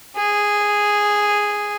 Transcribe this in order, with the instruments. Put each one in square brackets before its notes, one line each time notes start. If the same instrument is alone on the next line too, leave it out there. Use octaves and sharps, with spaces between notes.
[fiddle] G#4